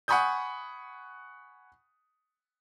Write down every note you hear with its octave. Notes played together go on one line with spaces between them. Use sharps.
F#5 G#5 B5 C#6 D#6 G6